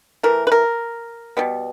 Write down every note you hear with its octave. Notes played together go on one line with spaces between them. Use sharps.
E3 A3 A#4
B4
A#4
B2 G3 B3